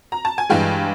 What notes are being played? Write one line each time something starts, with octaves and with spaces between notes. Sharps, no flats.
A#5
A5
G#5
G2 E3 G#3 F5 G5